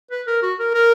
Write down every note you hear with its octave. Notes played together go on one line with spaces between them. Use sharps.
B4
A#4
F#4
A#4
A#4